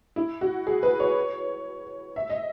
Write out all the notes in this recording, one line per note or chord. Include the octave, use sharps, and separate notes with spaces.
E4
F#4
G#4
B4
C#5
E5
D#5